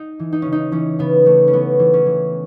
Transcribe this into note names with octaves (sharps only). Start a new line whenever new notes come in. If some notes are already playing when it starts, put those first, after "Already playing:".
Already playing: D#4
E3
D#4
C#3 C#4
D#4
E3 C#4
C#3 B3
E3 A3
C#4
E3 B3
E3
C#4
E3